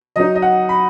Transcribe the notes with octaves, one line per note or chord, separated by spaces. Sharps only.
F#3 D#4 D#5
D#5
F#5
B5